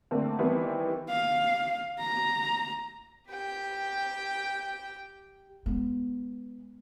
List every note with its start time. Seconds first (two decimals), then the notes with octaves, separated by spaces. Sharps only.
0.11 D3 A3 A#3 C4
0.39 D#3 E3 G3 B3 C4 E4
1.10 F5
1.99 A#5
3.30 G4 G5
5.66 G#3 B3